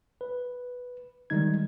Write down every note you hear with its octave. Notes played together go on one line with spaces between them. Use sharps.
B4
D#3 G3 G#3 D#4 G#6